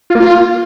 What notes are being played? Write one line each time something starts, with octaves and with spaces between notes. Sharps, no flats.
F4
A#3
F4